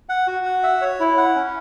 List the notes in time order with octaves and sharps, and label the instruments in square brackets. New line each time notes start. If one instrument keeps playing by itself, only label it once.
[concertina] F#5
F#4
F#5
E5
C#5
E4
F#5
C#4